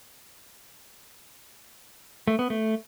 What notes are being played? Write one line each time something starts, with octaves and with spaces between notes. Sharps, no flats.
A3
B3
A3